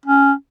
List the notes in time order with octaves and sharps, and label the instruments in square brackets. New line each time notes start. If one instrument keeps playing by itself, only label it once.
[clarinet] C#4